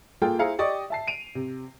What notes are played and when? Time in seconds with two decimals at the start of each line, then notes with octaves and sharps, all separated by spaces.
0.22 A#3 F4 G#4 A4 G5
0.39 E4 G#4 C5 F5 A#5 C#7
0.59 G4 D5 D#5 C#6 D#6
0.90 E5 A5 C7
1.07 D7 D#7 F7
1.35 C3